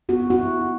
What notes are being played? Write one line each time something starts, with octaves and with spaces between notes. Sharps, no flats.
B3 F#4
E4 F#4